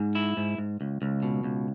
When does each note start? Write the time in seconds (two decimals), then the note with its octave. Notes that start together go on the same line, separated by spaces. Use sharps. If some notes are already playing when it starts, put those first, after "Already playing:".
Already playing: G#2
0.15 E4
0.37 G#2
0.58 G#2
0.81 C#2
1.02 C#2
1.23 B2
1.44 C#2